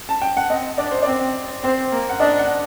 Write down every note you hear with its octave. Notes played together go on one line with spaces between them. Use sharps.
A5
G5
F#5
C4 D#5
D4 D5
C5
C4 D5
C4 C5
A#3
F#5
D4 D#5
F#5